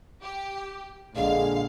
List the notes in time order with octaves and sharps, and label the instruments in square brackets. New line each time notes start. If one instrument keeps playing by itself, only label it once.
[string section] G4
[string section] A#1 F5 [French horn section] D3 G#3